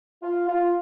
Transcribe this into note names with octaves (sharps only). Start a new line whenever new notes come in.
F4
F4